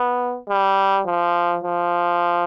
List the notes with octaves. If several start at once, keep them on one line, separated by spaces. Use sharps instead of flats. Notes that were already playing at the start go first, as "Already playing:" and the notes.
Already playing: B3
G3
F3
F3